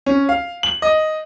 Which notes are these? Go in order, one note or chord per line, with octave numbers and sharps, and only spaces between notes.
C#4
F5
F#7
D#5